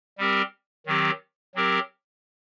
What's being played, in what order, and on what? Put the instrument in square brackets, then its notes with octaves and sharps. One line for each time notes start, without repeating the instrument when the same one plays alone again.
[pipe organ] G3 C4 G4 A#4
D#3 F#3 C4 G4
F#3 C4 G4 A#4